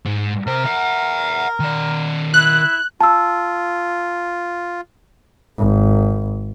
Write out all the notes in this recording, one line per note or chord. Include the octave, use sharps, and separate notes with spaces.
G#2
C3 A#4 C5
E5 F#5
D#3 D5
E4 F#6
F4 A5 E6
G#1